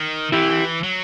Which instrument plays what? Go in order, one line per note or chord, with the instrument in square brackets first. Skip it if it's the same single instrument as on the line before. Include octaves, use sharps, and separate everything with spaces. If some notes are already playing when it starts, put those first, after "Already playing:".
Already playing: [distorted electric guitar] D#3
[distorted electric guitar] E3 [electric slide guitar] E4 G4
[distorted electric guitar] F#3